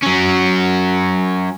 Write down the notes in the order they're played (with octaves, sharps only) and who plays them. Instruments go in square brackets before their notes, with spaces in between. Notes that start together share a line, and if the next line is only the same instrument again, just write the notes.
[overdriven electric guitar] F#3 C#4